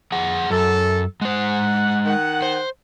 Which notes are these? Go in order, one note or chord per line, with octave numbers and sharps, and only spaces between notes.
F2 G#4 F#5
F#2 A4
G#3 C5 F#5
D#3 F#5
C5